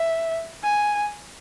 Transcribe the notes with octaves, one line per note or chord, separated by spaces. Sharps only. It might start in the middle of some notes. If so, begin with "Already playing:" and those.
Already playing: E5
G#5